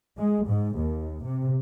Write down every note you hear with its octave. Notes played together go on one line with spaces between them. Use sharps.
G#3
G#2
D#2
C3